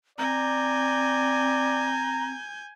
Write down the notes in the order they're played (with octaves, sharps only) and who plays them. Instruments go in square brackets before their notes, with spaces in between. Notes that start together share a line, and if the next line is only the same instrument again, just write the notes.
[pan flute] C4 [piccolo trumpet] D5 [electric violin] G#5 G6 [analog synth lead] A#5